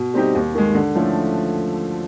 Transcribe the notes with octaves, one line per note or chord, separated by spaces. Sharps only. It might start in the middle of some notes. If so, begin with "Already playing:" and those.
Already playing: B2
G3 C4 D#4 G4
D#2
D#3 G#3
D3
F3 A3 C#4 E4